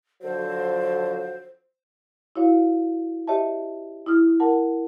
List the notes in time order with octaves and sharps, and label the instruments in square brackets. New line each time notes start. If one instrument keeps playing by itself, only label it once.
[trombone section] D3 F3 F#3 [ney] C5
[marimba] E4 F#4 C#5 F5
G4 C#5 D#5 E5 A5
E4 D#6 F6
A#4 F#5 A5